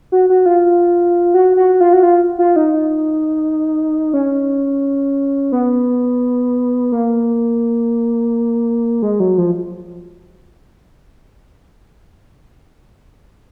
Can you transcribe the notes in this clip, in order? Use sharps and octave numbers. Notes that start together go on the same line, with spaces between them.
F#4
F#4
F4
F#4
F#4
F4
F#4
F4
F4
D#4
C#4
B3
A#3
G#3
F#3
F3